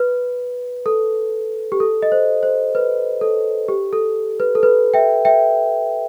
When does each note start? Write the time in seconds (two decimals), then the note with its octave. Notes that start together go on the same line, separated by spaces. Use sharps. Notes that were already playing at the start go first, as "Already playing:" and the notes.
Already playing: B4
0.86 A4
1.72 G4
1.80 A4
2.02 D#5
2.12 C5
2.43 C5
2.75 B4
3.21 A4
3.68 G4
3.93 A4
4.40 B4
4.55 A4
4.63 B4
4.94 E5 G5
5.25 E5 G5